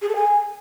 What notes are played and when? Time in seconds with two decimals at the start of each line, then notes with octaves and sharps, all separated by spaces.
0.02 G#4
0.09 A4
0.16 G#5